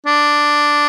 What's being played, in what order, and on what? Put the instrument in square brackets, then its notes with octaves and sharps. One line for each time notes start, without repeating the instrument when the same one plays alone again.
[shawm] D4